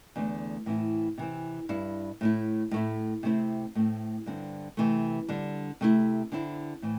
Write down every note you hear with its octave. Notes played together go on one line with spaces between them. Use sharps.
E2 D3 A3
A2 E3 C4 E4
C3 E3 C4
G2 G3 E4
A2 A3 E4
A2 A3 E4
C3 A3 C4 E4
A2 A3 C4
G2 D3 C4
C3 E3 A3
D3 G3 D4
C3 A3 E4
D3 C4 E4
A2 E3 C4